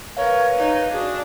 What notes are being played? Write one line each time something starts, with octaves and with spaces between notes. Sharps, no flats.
A#4 B4 C#5 F5
D#4
D4 F#4 G#4